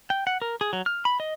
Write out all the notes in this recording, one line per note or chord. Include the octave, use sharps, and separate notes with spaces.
G5
F#5
A#4
G#4
F#3
F6
B5
D#5